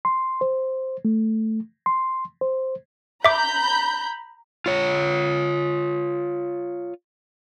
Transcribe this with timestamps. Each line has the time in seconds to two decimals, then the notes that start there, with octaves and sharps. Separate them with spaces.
0.05 C6
0.41 C5
1.05 A3
1.86 C6
2.41 C5
3.25 E5 A#5 B5 D6 G6
4.66 F4 C#5